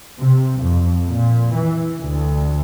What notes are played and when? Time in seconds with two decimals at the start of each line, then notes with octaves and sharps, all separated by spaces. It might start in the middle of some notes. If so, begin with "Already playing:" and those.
0.20 C3
0.64 F2
1.06 A#2
1.53 E3
1.99 D2